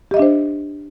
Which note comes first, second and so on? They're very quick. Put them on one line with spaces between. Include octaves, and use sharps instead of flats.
G4 D#5 E5 D4 C5